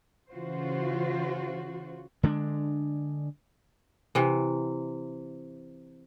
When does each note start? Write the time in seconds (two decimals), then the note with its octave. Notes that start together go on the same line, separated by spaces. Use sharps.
0.31 C#3 E3 F4 F#4 C5
2.23 D3 G#3 C#4 D4
4.15 C3 E3